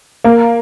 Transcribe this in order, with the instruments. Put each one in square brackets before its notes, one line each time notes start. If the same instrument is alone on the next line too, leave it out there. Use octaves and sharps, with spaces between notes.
[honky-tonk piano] A#3